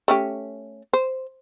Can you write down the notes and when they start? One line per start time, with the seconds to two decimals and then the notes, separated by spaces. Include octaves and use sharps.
0.08 A3 C#4 G4
0.93 C5